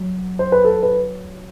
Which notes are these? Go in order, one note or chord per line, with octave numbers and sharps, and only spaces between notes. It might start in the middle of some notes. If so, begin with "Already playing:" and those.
Already playing: F#3
C5
B4
A4
B4